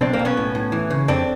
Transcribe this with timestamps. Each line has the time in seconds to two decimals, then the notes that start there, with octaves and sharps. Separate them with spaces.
0.01 B1 C4 D4
0.13 A#3 C4
0.19 B1
0.25 B3 C#4
0.37 A2
0.55 A2
0.72 E3
0.91 C#3
1.08 F2 C4 D4